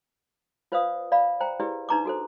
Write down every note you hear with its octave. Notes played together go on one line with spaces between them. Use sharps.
F4 B4 C5 D5 F5 D#6
D5 F5 B5
C5 G5 A#5
E4 G4 G#4 B4 D5
D4 D#4 B4 A#5 C#6 D6
F#4 A4 C5